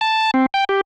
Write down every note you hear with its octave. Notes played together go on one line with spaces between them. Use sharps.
A5
C4
G5
G4